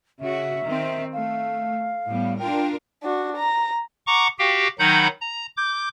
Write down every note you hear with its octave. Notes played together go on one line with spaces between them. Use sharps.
C#3 F#4 E5
D#3 C4
A3 F5
A2 G3 B3
D4 F4 A#4 G5
D4 F#4
A#5
F#5 A#5 C#6 D6
F#4 G4 F5 G5
D#3 F#3 D#4 F#5 B5 G6
A#5
D6 G6